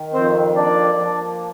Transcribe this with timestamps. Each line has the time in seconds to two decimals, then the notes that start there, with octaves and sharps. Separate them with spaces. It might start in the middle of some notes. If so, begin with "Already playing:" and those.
Already playing: D#3
0.13 F2 C4 C5
0.56 A#3 D4 D5
0.99 F3